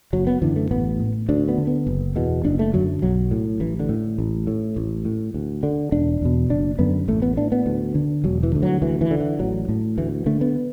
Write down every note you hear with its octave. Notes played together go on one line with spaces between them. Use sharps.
F#1 F#3
B3
F#2 D3 E3
A3
A1 B3
A2
D2 D4
B3
D3
B3
F#1
E2 B2
F#1 D4
A3
F#2 D3 F#3
B1 F#3
A2
A1 E3
D3
A2
A1
A2
A1
A2
D2
D3
E1 D4
E2 B2
F#1 D4
F#2 D3 B3
A1 A3
B3
A2 D4
B3
D2
D3
E1 F#3
E3
D2 D3
F#3
D2 E3
E3
D3
E3
A1 F#3
A2
D2 E3
D3 A3
B3